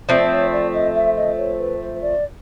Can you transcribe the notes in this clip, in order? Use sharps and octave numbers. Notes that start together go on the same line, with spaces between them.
F3 A3 C4 D5
C#5
D5
D#5
E5
D#5
C#5
B4
C5
D5